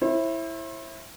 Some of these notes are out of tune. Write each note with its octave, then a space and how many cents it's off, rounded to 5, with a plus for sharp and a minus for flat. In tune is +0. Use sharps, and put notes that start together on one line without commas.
E4 +0 C5 +45